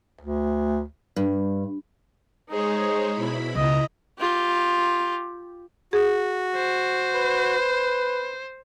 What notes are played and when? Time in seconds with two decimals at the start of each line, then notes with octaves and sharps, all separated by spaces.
0.21 D2
1.16 G2
2.49 G#3 D#4 G#4 C5 C#5
3.12 B2 E4 B5
3.55 C#2 E4 D#5 A#5
4.19 F4 G4
5.93 F#4 G#4
6.56 C5
7.14 B4